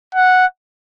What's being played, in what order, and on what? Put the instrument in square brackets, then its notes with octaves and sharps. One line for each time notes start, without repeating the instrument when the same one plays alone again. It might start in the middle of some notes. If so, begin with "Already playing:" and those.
[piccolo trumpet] F#5